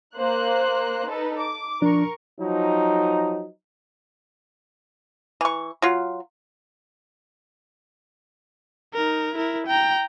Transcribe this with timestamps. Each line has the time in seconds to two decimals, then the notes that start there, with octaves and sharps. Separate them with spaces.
0.17 A#3 C5 F#6
1.09 D#4 A4 B4
1.40 D6
1.82 F3 D4 A#4 C#6
2.39 F3 F#3 D#4
5.41 E3 C#6
5.82 F#3 F4
8.94 D#4 A#4
9.35 E4 A#4
9.67 G5 A#5